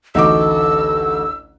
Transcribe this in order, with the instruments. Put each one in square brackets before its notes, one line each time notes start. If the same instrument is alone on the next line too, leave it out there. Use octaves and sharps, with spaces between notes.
[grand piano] A1 D2 [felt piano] D#4 F#4 D6 [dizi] A4 [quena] E6